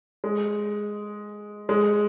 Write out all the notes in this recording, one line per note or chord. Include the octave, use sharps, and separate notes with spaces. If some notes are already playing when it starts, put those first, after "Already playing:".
G#3
G#3